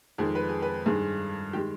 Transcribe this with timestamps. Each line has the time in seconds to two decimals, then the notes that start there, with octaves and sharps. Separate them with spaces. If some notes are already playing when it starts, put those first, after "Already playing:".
0.18 F2 D#3 G#3 G#4
0.35 B4
0.49 G#4
0.62 B4
0.86 G2 D#3 G#3 G#4
1.53 D#3 G#3 G4